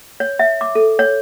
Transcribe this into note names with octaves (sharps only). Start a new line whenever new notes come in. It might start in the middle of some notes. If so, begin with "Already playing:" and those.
C#5
E5
D6
A4
C#5